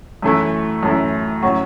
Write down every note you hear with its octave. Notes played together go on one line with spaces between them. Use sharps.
F#2 E3 A3 E4
F#2 E3 A3 E4
A2 F#3 C#4 F#4